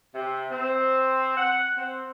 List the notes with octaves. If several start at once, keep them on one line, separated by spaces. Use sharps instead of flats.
C3
C4
F#5
C4